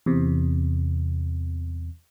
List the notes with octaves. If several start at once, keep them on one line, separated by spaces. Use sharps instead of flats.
E2 C3